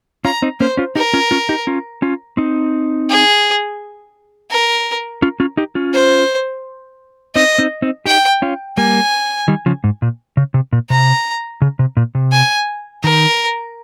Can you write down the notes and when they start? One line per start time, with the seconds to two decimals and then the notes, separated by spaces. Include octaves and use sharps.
0.25 C#4 F4 A#5
0.42 C4 D#4
0.60 A#3 C#4 C5
0.77 C#4 F4
0.96 D#4 G4 A#4
1.14 C#4 F4
1.31 C#4 F4
1.49 D#4 G4
1.67 C#4 F4
2.02 C#4 F4
2.37 C4 D#4
3.09 G#4
4.51 A#4
5.22 C#4 F4
5.40 C#4 F4
5.57 D#4 G4
5.75 C#4 F4
5.93 C5
7.35 C4 D#4 D#5
7.58 C4 D#4
7.82 C4 D#4
8.06 D#4 G4 G5
8.42 C#4 F4
8.77 G3 A#3 G#5
9.48 D#3 G3
9.66 C#3 F3
9.84 G#2
10.02 A#2
10.37 C#3
10.54 C3
10.73 A#2
10.90 C3 A#5
11.62 C#3
11.79 C3
11.97 A#2
12.15 C3
12.32 G#5
13.03 D#3 A#4